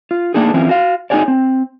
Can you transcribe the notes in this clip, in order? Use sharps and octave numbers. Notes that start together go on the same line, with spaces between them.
F4
A3 A#3 D4 D#4 G#4
E3 C4 C#4 E4 F4
F#4 F5
D#4 E4 F#4 G#4 C#5 D5
C4